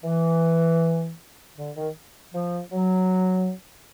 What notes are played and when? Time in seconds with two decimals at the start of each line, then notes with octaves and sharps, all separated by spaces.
0.04 E3
1.58 D3
1.76 D#3
2.34 F3
2.72 F#3